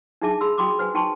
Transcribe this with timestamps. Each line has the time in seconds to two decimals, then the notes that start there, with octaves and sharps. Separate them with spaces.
0.22 D4 D#4 G#4 E5 A5 D6
0.41 G#4 B5 C6 E6
0.58 F#4 G5 B5 C6 D6 D#6
0.79 B4 C5 G#5
0.94 D#4 G5 A5 C6 C#6